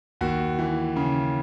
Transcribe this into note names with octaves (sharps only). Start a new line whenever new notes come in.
D#2 F#4
E3
C#3